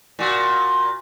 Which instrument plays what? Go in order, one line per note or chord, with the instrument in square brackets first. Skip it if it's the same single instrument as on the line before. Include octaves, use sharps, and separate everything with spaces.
[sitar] A#2 F#4